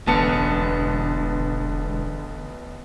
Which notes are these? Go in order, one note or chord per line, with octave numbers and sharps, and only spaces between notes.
E1 A1 D3 B3 A5 C#7